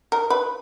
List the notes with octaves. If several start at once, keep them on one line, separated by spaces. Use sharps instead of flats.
A#4
B4